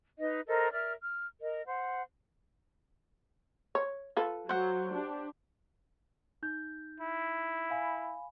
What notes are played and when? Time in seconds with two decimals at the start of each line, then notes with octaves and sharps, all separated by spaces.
0.19 D#4 B4 D#5
0.48 A4 A#4 C5 D#5
0.72 A#4 D5 E5 F6
1.02 F6
1.42 A#4 D#5
1.66 C5 F#5
3.75 C#5
4.17 F4 A4 B4
4.49 F#3 C5 F#5
4.92 D4 G4
6.43 D#4 G6
7.00 E4
7.70 F5 G#5 B5